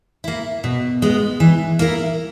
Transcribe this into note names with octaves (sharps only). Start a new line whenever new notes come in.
A#3 E4
B2
G#3 B3
E3
A#3 E4 A#4